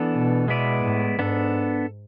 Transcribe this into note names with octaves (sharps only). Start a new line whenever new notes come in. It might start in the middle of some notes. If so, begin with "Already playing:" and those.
Already playing: E3 B3 D4 A4
B2
G#3 B3 E4 B4 D5
A2
G#2 B3 D4 A4